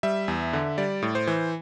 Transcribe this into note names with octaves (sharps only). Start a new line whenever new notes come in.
G3 E5
E2
D3
G3 D5
A2
C5
E3